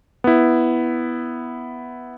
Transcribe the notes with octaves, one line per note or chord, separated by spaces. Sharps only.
B3 E4